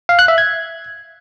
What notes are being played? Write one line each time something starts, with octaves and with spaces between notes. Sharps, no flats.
F5
F#6
E5
G#6